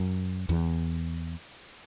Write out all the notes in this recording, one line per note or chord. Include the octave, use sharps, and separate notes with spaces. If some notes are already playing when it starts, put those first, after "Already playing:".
Already playing: F#2
E2